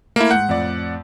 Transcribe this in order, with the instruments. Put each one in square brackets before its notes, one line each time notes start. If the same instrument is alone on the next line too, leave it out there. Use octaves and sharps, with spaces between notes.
[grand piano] A3 [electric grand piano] A#3 E4
[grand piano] G#2 G6 [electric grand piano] F#5
[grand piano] F2 A2 D5